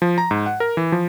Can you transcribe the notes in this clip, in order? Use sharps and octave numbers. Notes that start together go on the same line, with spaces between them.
F3
A#5
G#2
F#5
A#4
E3
F3